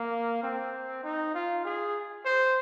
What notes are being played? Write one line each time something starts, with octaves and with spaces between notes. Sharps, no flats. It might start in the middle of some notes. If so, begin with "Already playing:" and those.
Already playing: A#3
C4
D#4
F4
G#4
C5